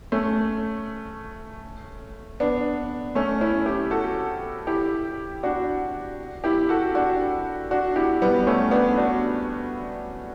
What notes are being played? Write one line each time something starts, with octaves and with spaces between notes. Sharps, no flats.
A3 C#4
B3 D4
A3 C#4
C#4 E4
E4 G4
F#4 A4
E4 G4
D4 F#4
E4 G4
F#4 A4
D4 F#4
D4 F#4
E4 G4
G3 B3
A3 C#4
B3 D4
D4 F#4